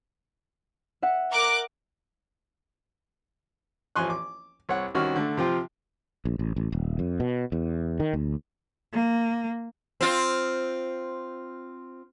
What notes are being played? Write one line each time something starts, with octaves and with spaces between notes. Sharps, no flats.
E5 F#5 C#7
A#4 D6 F#6
A1 F3 G#5 C6 C#6 F#6
D6
C2 C#5 F#5
C2 D#3 C#4 F#4 F6
D3 A3
C3 F3 F4 G5
A#1
A1
A1
D#1
F2
B2
E2
D#3
D2
A#3
C4 F4